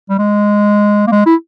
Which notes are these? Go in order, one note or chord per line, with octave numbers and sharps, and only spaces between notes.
G3
G#3
A#3
G#3
E4